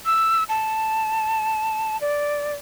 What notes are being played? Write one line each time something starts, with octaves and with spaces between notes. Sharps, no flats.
E6
A5
D5